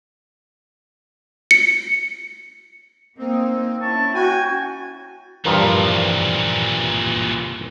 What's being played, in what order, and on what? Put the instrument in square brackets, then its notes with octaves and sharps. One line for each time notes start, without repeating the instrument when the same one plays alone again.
[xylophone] C#7
[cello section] A#3 D#4 [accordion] C4
[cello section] C#4 E4 [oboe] A5 [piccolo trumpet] C#6
[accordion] F#4 [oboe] G5 [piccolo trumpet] G#5
[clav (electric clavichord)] G2 F3 A#4 [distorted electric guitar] A#2 E3